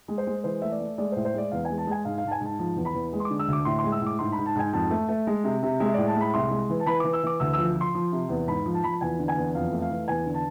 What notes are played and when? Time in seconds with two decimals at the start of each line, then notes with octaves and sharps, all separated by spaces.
0.08 G#3
0.18 C5
0.27 G#3
0.44 E3 C5
0.62 A3 E5
0.72 D5
0.80 A3
0.98 G#3 D5
1.12 C5
1.16 A2
1.25 C5
1.34 G#3 D5
1.51 E2 F5
1.65 G#5
1.70 G#3
1.78 A5
1.87 G#3 G#5
2.05 G#2 F5
2.18 F5
2.24 G#2 A5
2.31 G#5
2.41 G#2 A5
2.59 F3 A5
2.76 E2
2.85 B5
2.94 E2
3.13 G#3
3.20 C6
3.25 D6
3.30 D3
3.39 E6
3.47 D2
3.53 D6
3.65 A2 C6
3.79 C6
3.84 G#3
3.92 E6
4.01 A2
4.06 D6
4.19 G#2 C6
4.32 B5
4.38 G#2
4.46 A5
4.55 G#2 G#5
4.73 F2 A5
4.90 A3
5.08 A3
5.27 G#3
5.44 C3
5.63 C3
5.80 G#3 E5
5.94 A2 D5
6.07 A5
6.15 G#3
6.21 B5
6.34 C2 C6
6.51 G#3
6.70 E3
6.80 A5
6.86 E3 B5
7.00 E3 D6
7.13 E6
7.23 E3 D6
7.40 D2 E6
7.53 E6
7.58 F3
7.76 F3
7.81 C6
7.95 F3
8.12 C3
8.29 E2
8.47 G#2 B5
8.66 F3
8.74 A5
8.84 F3 B5
8.93 A5
9.01 E2 G#5
9.19 D3
9.28 G#5
9.36 E2
9.55 F2 F5
9.72 A3
9.82 F5
9.90 E3
10.08 E2 G#5
10.26 D3
10.34 A5